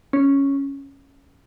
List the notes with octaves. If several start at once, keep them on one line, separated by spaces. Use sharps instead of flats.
C#4